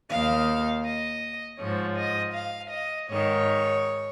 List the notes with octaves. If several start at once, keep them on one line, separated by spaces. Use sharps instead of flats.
D#2 D#3 F5
D#5
G#2 F3 C#5
D#5
F5
D#5
G#2 D#3 C#5